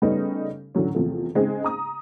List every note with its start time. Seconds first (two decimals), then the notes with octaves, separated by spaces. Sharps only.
0.02 C#3 G3 A3 B3 C#4 D#4
0.75 A2 D3 E3 F#3 C#4
0.95 E2 C3 F3 A3
1.35 C#3 G#3 C4 D#4 G#4
1.64 A#5 D#6